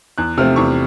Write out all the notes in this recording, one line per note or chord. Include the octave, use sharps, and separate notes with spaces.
E2 F#6
C3 F3 A3 C4 F6
E2 C#6